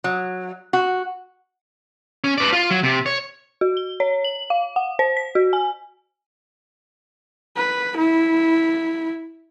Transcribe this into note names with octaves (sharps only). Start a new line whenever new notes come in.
F#3
F#4
C#4
B4 D5
F4
F#3
C3
C#5
F#4
G7
C#5
F#7
F5
F#5
C5
B6
F#4
G#5
B4
E4